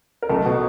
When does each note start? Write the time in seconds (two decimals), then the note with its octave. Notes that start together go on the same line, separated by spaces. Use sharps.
0.23 A#4
0.29 B1 A3 A4
0.45 B2